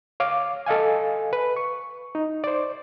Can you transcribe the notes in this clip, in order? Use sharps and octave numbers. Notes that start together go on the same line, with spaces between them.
C#5 F5 D6
A4 D#5 F5 G#5
B4
C#6
D#4
C5 D5